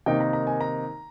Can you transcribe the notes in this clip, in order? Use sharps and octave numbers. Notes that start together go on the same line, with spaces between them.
C3 D#3 A#3 D#4 G5
A#5
A#5
G#5
A#5